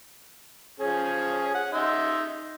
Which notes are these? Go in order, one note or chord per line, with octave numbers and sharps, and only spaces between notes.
F3 C#4 G#4
F#5
D#4 E5 C6